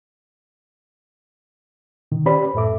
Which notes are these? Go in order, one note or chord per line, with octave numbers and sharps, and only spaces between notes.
B2 D3 D#3
C#4 G4 B4 C5 D5 B5
F#2 A2 A4 E5 D6